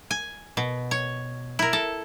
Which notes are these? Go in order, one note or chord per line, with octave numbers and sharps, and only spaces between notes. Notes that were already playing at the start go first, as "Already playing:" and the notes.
G#5
B2
C#5
E4 A#4
A4